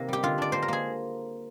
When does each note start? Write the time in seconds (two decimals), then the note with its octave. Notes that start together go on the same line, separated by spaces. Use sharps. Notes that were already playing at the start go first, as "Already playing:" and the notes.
Already playing: C3 D#3 A#3 C4
0.08 G3 G4
0.23 D3 F4
0.38 D4 D5
0.52 A#3 C5
0.62 A#4
0.68 A#3 G#4